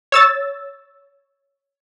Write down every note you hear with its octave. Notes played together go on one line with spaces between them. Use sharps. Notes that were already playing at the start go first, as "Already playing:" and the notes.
C#5 E6 A6